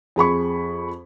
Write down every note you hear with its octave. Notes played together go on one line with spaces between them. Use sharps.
F2 G#4 B5 C#6